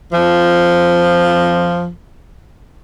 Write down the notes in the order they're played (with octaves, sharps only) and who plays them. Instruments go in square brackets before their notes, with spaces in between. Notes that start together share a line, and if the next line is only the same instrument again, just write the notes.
[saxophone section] F2 F3